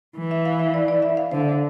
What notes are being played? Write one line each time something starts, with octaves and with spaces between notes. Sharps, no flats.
E3
E5
F5
E5
D5
D5
E5
F5
D3 C5